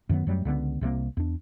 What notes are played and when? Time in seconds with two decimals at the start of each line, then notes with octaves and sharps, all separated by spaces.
0.09 F#2 D#3 F#3 B3
0.27 F#2 F#3 G3 A3
0.45 C#2 D3 G#3 B3
0.81 C2 C3 G3 A#3
1.17 E2 D4